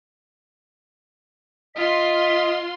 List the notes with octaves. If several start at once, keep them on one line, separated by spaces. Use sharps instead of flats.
F4 D#5 C6 B6